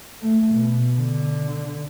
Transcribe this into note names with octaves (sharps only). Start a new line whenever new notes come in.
A3
B2
D3